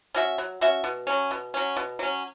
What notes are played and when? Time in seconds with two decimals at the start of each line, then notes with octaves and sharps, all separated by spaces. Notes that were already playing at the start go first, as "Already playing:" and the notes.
0.14 C#4 F#4 E5
0.38 F#3
0.61 C#4 F#4 E5
0.84 B2
1.07 F#3 C#4
1.31 B2
1.54 F#3 C#4
1.76 B2
1.99 F#3 C#4